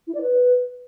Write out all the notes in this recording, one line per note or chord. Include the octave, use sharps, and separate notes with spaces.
E4
D5
B4